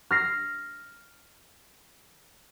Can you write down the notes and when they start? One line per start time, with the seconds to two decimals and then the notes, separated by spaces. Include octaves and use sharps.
0.11 F6 A#6 C7